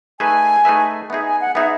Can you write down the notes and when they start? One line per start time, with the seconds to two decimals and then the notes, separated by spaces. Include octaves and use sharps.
0.20 A3 D#4 G#4 B4 E5 G#5
0.65 A3 D#4 G#4 B4 E5
1.10 B3 D#4 G#4 E5
1.25 G#5
1.41 F#5
1.55 B3 D#4 G#4 E5